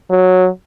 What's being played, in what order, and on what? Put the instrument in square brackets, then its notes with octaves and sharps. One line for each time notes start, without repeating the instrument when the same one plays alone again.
[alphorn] F#3